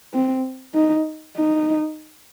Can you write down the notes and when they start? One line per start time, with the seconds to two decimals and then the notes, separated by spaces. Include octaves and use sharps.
0.14 C4
0.75 D#4
1.37 D#4